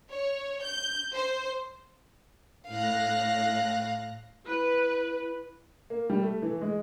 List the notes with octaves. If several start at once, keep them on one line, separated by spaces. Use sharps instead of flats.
C#5
G6
C5
A2 F5 F#6 A#6
E4 B4
A#3
G3
A3
E3
G#3